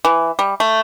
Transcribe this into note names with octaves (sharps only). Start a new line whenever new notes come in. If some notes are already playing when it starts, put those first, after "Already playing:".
E3
G3
A3